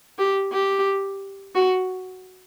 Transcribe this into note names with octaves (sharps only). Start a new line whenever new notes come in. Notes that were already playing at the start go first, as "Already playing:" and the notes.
G4
G4
F#4